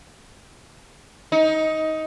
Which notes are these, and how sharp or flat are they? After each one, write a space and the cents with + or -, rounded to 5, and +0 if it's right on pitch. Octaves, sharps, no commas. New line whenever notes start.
D#4 +15